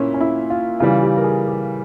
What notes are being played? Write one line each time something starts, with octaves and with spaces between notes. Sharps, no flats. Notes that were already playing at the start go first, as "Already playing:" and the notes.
Already playing: A#2 C#4 E4
C#4
E4
F4
C#3 E3 G3 F4
G4
A#4
G#4
G4